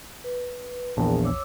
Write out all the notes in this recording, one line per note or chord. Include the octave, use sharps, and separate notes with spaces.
B4
A#1 E2 A#4 G5 A5
C#5 D6 E6